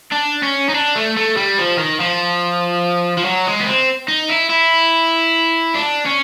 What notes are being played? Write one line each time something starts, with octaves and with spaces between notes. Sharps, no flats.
D4
C#4
D#4
D4
A3
A3
G3
F3
D#3
F3
F3
F#3
G#3
B3
C4
D#4
E4
E4
D4
C#4